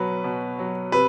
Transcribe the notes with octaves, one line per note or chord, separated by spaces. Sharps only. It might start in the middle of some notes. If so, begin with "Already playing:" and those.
Already playing: B2 F#3 B4
B2
F#3
C3 B4